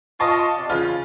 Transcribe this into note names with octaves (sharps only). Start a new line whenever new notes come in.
F4 D#5 A5 C#6
C3 D5 F5
C#3 E3 F4